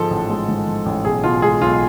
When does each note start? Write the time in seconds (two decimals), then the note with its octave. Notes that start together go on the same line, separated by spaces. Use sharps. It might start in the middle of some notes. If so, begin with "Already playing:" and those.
Already playing: G#2 F3 G#3 A4
0.11 A1
0.30 G#3
0.49 G#2
0.67 F3
0.86 A1
1.04 B1 G#4
1.24 B2 F4
1.42 G#3 G#4
1.61 B1 F4